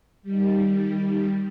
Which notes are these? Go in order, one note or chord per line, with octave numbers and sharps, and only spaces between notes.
D#3 G3